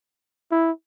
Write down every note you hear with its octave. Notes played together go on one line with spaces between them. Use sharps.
E4